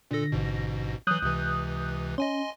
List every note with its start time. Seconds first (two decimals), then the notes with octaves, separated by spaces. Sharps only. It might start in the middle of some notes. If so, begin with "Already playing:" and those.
0.11 A#2 D3 A4 A#6
0.32 A1 G#2 B2
1.07 E3 F#3 D#6 F#6 G6
1.22 C#2 C3 E3
2.18 C#4 D#5 G#5 C6